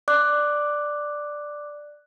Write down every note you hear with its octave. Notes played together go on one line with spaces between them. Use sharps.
D5 D6 F#6